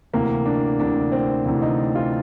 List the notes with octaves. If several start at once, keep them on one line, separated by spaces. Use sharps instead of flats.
D2 C3 E3 A#3
D4
D2 C3 E3 D4
C4
D2 C3 E3
D#4
F4